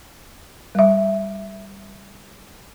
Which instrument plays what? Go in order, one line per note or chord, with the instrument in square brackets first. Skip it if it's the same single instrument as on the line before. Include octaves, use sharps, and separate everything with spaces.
[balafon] G3 E5